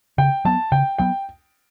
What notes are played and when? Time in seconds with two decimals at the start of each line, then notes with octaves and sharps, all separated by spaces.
0.18 C#3 G5
0.45 F#3 B3 A5
0.72 C#3 G5
0.98 F#3 B3 G5